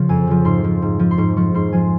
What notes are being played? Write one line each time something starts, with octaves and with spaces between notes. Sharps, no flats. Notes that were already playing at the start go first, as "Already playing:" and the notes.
Already playing: C#3 F3
F2 G#5
C#3 F3
G#2 C6
F3
G#2
F3
C6
G#2 C#6
F3 C#6
G#2 C6
F3 G#5